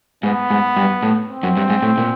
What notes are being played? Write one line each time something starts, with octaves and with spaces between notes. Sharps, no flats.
G#2 B3
G#2
G2
A2
C4
F#2
G2
G#2
A2
A#2